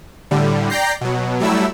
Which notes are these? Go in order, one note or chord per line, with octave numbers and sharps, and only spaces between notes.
A2 D3 G3
D5 G5 A#5 G6 A#6 C7
B2 F#3
F#3 G3 A3 E4 E6